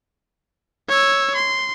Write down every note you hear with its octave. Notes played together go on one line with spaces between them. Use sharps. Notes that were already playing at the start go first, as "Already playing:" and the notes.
C#5 E6
C6